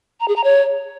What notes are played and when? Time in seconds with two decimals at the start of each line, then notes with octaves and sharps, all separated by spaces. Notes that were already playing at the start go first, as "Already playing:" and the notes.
0.20 A#5
0.28 G#4
0.36 A#5
0.44 C#5